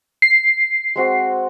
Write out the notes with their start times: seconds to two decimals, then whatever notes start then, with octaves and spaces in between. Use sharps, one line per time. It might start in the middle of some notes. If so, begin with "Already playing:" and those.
0.22 C7
0.96 G#3 C4 F#4